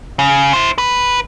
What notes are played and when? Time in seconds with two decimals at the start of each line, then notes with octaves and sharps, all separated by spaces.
0.19 C#3
0.53 E4 C5
0.78 B4